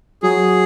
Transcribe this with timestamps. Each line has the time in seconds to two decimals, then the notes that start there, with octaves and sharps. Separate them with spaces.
0.23 F#3 G#4